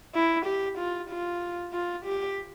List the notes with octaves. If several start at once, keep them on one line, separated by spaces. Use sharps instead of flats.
E4
G4
F4
F4
F4
G4